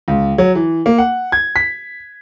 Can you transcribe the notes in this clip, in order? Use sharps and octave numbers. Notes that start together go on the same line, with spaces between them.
C#2
F#3
E3
A#3
F#5
G#6
B6